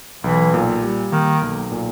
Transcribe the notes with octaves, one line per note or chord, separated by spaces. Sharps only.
B1 E3
A#2
G3
D#3 A#3
B1
A#2